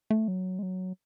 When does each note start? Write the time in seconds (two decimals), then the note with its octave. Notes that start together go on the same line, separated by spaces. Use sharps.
0.10 A3
0.28 F#3
0.59 G#3
0.63 F#3